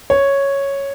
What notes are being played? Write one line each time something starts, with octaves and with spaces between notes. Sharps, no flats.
C#5